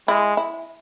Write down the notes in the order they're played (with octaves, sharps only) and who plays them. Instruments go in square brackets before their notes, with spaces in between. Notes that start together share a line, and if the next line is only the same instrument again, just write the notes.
[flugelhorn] G#3 [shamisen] E4
[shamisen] E4